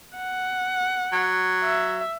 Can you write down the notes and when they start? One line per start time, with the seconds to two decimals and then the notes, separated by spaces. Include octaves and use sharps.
0.16 F#5
1.12 F#3
1.63 E5